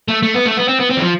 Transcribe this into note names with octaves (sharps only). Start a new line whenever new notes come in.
A3
A3
B3
A3
B3
C4
B3
C4
E3
F3